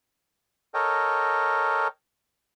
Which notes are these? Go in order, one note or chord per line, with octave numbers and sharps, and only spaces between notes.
A4 A#4 C#5 D#5 G5